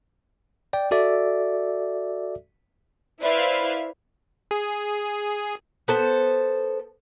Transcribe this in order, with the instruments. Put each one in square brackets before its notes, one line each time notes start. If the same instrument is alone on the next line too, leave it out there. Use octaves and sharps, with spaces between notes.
[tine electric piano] D5 G5
F#4 A4 D5 E5
[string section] E4 B4 C5 D5 E5 F5
[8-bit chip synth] G#4
[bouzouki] B3 A4 C5